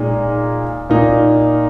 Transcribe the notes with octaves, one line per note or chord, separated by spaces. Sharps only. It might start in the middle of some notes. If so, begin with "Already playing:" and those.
Already playing: A#2 G#3 D#4
A#2 A#3 D#4